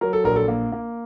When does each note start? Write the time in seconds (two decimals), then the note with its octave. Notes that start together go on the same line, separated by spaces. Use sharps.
0.01 F#3 A#4
0.13 A4
0.24 A#1 A#4
0.36 A4
0.48 A#3
0.72 A#3